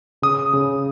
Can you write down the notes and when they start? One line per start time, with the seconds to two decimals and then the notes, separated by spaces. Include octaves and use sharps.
0.22 C#3 D#6
0.53 C#3